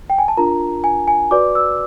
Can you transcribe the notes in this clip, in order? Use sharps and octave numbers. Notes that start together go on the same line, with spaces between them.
G5
G#5
A5
D4 F4 A#4 A#5
G#5
G#5
F#4 B4 D5 D6
E6